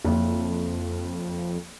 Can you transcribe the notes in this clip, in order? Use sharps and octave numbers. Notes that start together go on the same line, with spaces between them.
F#1 F2